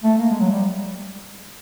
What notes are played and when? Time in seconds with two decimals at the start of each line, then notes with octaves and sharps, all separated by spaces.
0.04 A3
0.18 A#3
0.30 G#3
0.40 F#3
0.52 G3